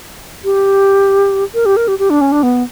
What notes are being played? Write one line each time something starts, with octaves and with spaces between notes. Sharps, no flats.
G4
A#4
G4
A#4
G4
G4
D4
C#4
D4
B3